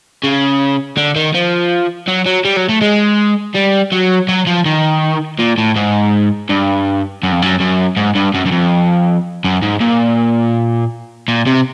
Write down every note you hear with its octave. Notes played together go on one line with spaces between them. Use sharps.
C#3
D3
D#3
F3
F#3
F#3
G3
F#3
A3
G#3
G3
F#3
F#3
F3
D#3
A#2
A2
G#2
G2
F#2
F2
F#2
F#2
G#2
G2
F#2
F#2
F2
F#2
G#2
A#2
A#2
C3